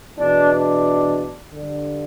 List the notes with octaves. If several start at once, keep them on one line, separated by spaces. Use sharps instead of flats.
E2 B2 D4
D4
G2 D3